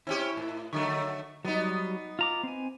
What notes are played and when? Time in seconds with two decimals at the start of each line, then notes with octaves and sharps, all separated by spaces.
0.07 C4 C#4 E4 G4
0.37 A2
0.73 D3 F#3 A3 C#6
1.45 F#3 G3 B3 D#4
2.19 F4 A#5 D6
2.44 C4 G#5